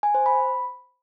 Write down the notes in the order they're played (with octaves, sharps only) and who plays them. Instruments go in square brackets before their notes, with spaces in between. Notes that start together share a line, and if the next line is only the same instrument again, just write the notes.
[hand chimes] G#5
C5
B5